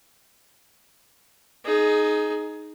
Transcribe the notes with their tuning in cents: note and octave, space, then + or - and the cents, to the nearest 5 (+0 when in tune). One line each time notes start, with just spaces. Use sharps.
D#4 +0 G#4 +20